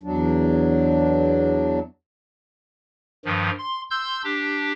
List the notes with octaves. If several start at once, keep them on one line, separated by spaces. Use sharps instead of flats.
E2 F#3 D4
G2 D#3 F3
C6
C6 E6 G6
D4 G4